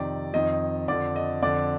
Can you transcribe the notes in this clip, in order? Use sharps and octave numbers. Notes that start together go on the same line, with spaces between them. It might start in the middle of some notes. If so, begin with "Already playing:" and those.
Already playing: F2 C3 D#3 D5
F2 D#3 D#5
F2 D3 D5
D#5
F2 D3 D5